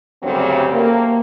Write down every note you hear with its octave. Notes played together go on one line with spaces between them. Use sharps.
D2 G2 C#3 F#3 G3 C4
A#3